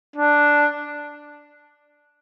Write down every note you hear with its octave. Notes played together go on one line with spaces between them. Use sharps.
D4